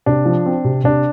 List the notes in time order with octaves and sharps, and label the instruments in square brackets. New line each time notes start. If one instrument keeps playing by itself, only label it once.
[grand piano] C3 [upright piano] D4
[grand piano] F3
C4
C3
[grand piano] C3 [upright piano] D4